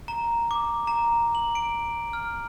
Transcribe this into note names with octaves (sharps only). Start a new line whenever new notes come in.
A#5
D6
A#5
F#7
D7
F6